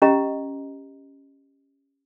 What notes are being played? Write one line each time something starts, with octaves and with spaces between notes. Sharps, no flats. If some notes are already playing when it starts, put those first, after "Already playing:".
C#4 G4 D#5 A#5